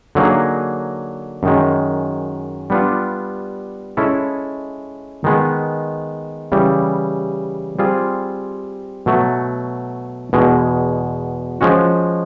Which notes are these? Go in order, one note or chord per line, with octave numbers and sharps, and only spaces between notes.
D3 F#3 A#3 D#4 G#4
F#2 D#3 G#3
G3 B3 D4 F4
G#3 C#4 E4 A4
D#3 G#3 B3
C#3 E3 G3
G3 C4 F4 G#4
B2 F#3 A3
E2 B2 G#3
F3 G#3 C#4 F#4